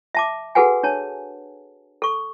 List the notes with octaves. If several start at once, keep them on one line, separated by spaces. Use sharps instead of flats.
E5 A5 D6
F#4 G#4 A4 B4 F#5 G#5
D4 C#5 A5
A4 C#6